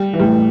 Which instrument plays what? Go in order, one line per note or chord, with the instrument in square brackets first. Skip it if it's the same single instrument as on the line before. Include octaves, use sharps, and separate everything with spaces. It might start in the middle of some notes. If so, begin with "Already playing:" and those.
Already playing: [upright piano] G3
E3
[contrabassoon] A2 [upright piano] G3